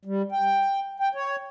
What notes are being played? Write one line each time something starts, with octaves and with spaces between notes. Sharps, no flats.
G3
G5
G5
C#5